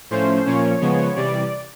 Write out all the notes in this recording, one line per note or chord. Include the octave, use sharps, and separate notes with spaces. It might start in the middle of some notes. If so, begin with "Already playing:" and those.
A2 F3 A3 C#4 C5
A#2 F3 A#3 C#4 C#5
C#3 F3 G#3 B3
C3 E3 G3 D5